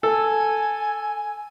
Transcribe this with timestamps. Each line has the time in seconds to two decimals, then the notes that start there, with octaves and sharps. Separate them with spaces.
0.03 A4 G#5